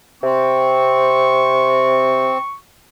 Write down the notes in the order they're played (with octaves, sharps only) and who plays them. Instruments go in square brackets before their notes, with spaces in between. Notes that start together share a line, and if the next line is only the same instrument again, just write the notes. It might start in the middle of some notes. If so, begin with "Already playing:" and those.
[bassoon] C3 [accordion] C4 [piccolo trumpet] C#6